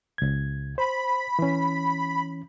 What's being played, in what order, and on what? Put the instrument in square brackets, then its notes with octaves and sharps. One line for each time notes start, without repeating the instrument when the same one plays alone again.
[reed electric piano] C#2 G#6
[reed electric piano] C5 [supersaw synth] B5
[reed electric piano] E3 C#4